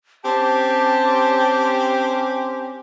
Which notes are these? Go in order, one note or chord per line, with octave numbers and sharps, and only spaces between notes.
C4 C#4 G4 A5